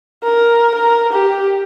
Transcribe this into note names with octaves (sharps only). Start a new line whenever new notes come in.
A#4
A#4
G4